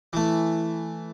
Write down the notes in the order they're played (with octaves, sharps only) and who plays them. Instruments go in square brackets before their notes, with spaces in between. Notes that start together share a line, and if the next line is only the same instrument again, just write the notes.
[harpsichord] E3 A3